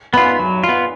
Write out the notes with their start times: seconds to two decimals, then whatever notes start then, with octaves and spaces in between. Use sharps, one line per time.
0.13 B3 F4 B5
0.39 F#3
0.64 F4
0.69 B3